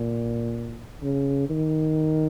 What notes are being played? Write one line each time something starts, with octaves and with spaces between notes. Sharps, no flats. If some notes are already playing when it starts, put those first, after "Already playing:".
Already playing: A#2
C#3
D#3